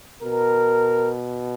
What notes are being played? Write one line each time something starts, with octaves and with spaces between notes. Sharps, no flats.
B2 A#4